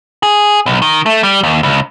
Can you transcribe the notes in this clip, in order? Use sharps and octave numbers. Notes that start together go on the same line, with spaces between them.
G#4
B1
D#3
A3
G3
D#2
C#2